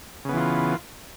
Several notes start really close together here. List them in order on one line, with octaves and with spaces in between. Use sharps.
C#3 B3 E3 F4